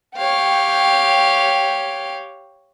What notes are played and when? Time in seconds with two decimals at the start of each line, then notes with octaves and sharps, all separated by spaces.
0.16 G4 C#5 F5 G5